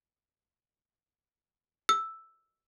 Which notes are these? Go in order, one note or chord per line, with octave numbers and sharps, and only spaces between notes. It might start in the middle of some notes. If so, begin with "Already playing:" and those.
E6